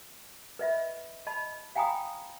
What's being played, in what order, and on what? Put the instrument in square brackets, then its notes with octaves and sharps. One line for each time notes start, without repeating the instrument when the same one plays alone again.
[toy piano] B4 D#5 E5 B5
D#5 A5 B5
F5 G5 G#5 A#5 B5 D#6